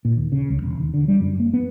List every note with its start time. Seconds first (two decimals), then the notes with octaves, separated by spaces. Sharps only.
0.05 A#2
0.17 D#2
0.32 C#3
0.50 C#2
0.62 E1
0.80 D#2
0.94 D3
1.08 G3
1.21 F#2
1.40 A#3
1.53 B3